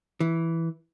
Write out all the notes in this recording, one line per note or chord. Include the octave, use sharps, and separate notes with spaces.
E3